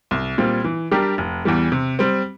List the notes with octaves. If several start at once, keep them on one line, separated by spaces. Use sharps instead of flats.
C2
A#2 G3 C4 F4
E3
G3 D4 G4 A#4
F1
E2 E3 G3
C3
G3 C4